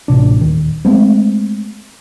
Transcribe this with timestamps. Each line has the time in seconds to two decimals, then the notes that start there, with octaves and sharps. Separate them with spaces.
0.08 A1 C3 D4
0.41 D#1 D#3
0.85 G#3 A3 B3 C4